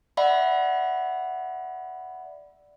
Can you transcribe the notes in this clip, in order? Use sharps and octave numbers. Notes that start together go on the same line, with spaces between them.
D5 E5 F#5 B5